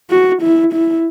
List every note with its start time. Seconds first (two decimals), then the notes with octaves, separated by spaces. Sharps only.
0.10 F#4
0.42 E4
0.73 E4